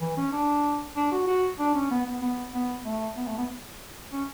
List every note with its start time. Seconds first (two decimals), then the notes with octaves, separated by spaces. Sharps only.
0.01 E3
0.17 C#4
0.33 D4
0.96 D4
1.12 F#4
1.27 F#4
1.59 D4
1.75 C#4
1.91 B3
2.06 B3
2.22 B3
2.54 B3
2.86 A3
3.17 B3
3.27 A3
3.38 B3
4.12 C#4